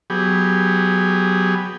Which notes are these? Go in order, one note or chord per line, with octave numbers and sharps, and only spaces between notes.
F#3 B3 G4 G#4